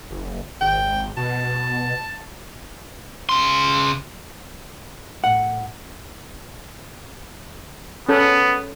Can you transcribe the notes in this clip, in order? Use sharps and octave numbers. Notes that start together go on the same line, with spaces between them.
F#1
G#1 G5
B2 A5
C#3 C6
A2 F#5
B3 C#4 A4